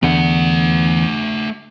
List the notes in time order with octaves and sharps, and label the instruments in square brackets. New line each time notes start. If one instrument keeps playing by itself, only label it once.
[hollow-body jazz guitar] E2 D3 [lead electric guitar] A3 F#5